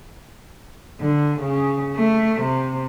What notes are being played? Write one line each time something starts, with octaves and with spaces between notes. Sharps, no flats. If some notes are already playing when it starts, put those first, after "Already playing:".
D3
C#3
A3
C3